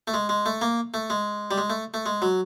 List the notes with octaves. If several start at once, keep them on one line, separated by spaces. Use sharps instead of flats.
A3
G#3
G#3
A3
A#3
A3
G#3
G3
G#3
A3
A3
G#3
F#3